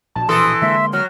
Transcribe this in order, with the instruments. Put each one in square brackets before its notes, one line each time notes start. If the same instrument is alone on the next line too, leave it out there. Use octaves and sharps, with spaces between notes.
[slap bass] A#1 B2 [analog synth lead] A5
[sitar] E3 A4 [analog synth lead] C6 [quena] D#6
[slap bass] D3 G#3 A#3 [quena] E5
[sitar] F#3 [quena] F6